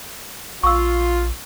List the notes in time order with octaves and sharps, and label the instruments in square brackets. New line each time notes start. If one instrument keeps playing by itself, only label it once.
[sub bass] A#1 [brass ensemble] F4 [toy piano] C#6 E6